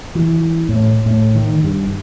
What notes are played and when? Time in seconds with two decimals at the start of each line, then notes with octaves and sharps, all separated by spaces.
0.15 E3
0.69 A2
1.06 A2
1.35 D#3
1.64 G2